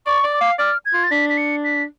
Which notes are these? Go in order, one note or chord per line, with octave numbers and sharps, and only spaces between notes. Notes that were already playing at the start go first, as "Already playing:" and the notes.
D5 C#6
D5
D6
F5
D5 F6
G#6
F4
A6
D4 B6
B6
C#7
B6